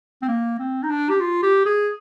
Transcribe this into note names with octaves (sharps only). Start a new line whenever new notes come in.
C4
A#3
C4
D#4
D4
G4
F4
G4
G#4